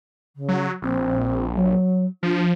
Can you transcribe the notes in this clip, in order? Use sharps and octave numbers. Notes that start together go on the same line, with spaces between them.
C#3
F#3
A#1 C4
F#3
F3 D4